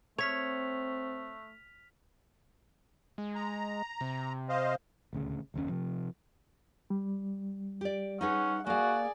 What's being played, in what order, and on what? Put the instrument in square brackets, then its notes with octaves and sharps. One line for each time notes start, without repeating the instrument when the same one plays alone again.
[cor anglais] A3 [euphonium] C4 [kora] C#5 [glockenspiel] F6 B6 F7
[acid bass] G#3
[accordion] A#5
[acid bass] C3
[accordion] C5 D#5 F5
[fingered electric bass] D#1 D2 C#3
F#1 D#2 A#2 C#4
C3 F3
[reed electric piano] G3
[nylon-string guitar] G4 D5
[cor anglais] C#4 [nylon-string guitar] D#4 G#4 B4 [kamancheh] F#5
[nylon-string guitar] A#3 F5 [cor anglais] F#4 [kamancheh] G#4 D5